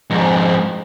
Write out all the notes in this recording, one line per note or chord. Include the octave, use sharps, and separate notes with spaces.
F2 G#2